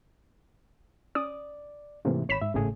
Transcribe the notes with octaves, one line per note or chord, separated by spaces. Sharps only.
C#4 D5 D#6
G#2 C3 E3 A3 A#3 C4
G#1 C#5 B5 B6 E7
G#2 E5
G#1 A2 C#3 A3 G#4